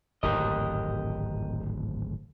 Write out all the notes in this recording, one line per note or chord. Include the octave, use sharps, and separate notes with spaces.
D1 G#1 F2 G4 A#4 D#5